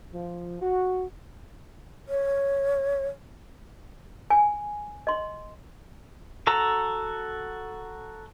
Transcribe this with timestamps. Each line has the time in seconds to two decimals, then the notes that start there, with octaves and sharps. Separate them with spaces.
0.13 F3
0.62 F#4
2.09 C#5
4.30 G#5
5.07 D#5 C6
6.47 F#4 A4 A#5